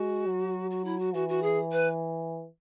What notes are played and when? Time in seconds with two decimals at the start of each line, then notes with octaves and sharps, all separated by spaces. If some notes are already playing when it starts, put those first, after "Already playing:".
Already playing: G#3 F#4
0.26 F#3
0.70 F#4
0.84 E4
0.98 F#4
1.13 E3 F#4
1.28 F#4
1.42 G#4
1.71 B4